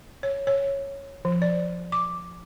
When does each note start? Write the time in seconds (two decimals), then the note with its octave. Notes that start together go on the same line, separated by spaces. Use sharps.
0.23 C#5
0.47 C#5
1.25 F3
1.42 D5
1.92 D6